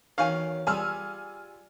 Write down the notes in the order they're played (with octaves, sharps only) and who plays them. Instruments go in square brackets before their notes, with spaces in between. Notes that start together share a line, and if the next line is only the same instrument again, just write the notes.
[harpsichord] E2 C#4 [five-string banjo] D#3 F#4 G#5 [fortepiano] F5
[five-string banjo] G3 [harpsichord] F4 G#4 [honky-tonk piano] G#5 E6 F6